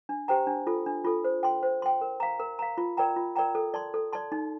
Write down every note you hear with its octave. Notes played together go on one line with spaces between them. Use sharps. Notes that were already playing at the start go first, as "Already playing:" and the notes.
D4
G4 C5 G5 A#5
D4
F4 A4
D4
F4 A4
C5
G5 C6
C5
G5 C6
A#4
F5 A#5
A#4
F5 A#5
F4
A#4 D5 G5 A#5
F4
A#4 D5 G5 A#5
A4
D5 A5 C6
A4
D5 A5 C6
D#4